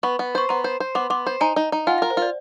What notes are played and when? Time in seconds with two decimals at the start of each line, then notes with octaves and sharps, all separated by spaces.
0.03 B3 B5 C#6
0.19 B3
0.35 C5 C#6
0.49 B3 A#5 C6
0.64 C5
0.80 C5
0.95 B3 C6 D6
1.10 B3 C6 D6
1.27 C5
1.41 D#4 G#5 A#5
1.56 D#4
1.72 D#4
1.87 F4 F#5 G#5
1.98 F5
2.02 A#4
2.10 C5
2.17 F4 D5